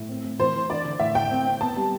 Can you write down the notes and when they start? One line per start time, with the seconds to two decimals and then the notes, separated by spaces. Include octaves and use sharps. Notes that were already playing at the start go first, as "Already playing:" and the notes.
Already playing: A2
0.09 C4
0.24 A2
0.39 E3 C5
0.54 E3
0.70 D4 D5
0.85 D3
1.00 A2 E5
1.15 A2 G5
1.30 C4
1.46 C4
1.61 B3 A5
1.76 G3